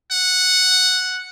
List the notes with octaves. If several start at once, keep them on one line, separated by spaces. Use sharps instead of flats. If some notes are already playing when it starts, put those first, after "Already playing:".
F#5